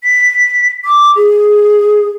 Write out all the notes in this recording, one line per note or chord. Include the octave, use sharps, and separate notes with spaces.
B6
D6
G#4